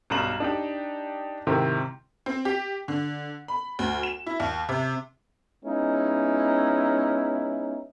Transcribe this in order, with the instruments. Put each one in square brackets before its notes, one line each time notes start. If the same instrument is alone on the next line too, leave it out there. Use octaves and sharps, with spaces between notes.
[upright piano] B1 G2 A#5 E7 F#7
D4 D#4 G4
G#2 C3 D#3 C4 E4 G4
[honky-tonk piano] C4
G4
D3
B5
D2
E7
E4
D#2
C3
[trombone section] G#3 B3 C#4 D#4 E4